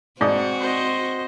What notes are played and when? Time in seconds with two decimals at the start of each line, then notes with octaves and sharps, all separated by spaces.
0.21 G#2 C4 F#4 D5 A5 D#6
0.59 C5 D#5